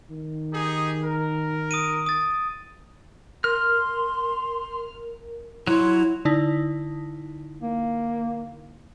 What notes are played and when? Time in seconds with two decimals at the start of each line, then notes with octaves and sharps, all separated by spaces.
0.11 D#3
0.53 D#4 G4 G#4
1.03 A#4
1.71 D#6 D7 D#7
2.06 D#6 A6
3.44 A#4 C6 F6
5.67 F#3 E4 C#5 C6
6.25 D3 D#4 E4
7.63 A#3